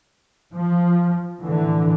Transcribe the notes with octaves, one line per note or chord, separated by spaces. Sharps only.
F3
A2 D3 E3